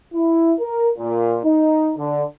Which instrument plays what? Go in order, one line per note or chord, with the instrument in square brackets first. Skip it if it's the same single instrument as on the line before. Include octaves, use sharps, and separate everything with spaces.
[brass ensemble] E4
A#4
A#2
D#4
D3